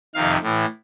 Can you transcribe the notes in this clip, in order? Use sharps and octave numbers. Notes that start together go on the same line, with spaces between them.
F2 C3 D#3 F5
A2 E3